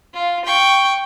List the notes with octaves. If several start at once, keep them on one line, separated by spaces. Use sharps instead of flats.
F4
G5 C#6